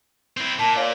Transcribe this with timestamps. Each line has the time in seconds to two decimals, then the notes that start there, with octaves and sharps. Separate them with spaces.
0.37 C4 E4
0.59 A#2 A5
0.76 C#5 D5 F5